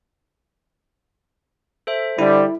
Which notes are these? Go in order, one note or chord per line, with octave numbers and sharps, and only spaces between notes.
A4 C5 E5
D3 G3 E4 D5